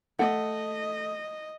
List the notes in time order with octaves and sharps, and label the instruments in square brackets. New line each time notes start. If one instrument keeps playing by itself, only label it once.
[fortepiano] A3 [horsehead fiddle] D#5 [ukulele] F#5